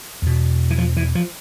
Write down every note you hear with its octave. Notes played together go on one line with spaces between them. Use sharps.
E2 B2
E3
F3
E3
F3